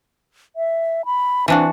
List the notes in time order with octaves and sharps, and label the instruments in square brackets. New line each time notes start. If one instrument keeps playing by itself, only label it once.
[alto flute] E5
B5
[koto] E3 D4 F#4 [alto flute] C4